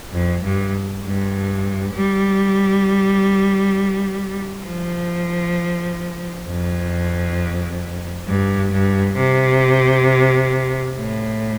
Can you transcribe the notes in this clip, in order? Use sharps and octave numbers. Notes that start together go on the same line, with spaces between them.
F2
G2
G2
G3
F3
F2
G2
G2
C3
A2